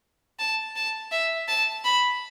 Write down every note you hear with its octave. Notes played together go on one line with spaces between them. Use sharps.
A5
A5
E5
A5
B5